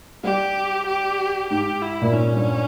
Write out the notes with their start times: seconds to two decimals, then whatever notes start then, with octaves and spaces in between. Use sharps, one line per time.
0.24 G3 G4
0.87 G4
1.50 G#2 G4
1.82 E4
2.02 A#2
2.12 G#2 C#4
2.33 G2